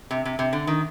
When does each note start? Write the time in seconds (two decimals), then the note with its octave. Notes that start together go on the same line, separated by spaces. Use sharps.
0.11 C3
0.25 C3
0.39 C3
0.53 D3
0.67 D#3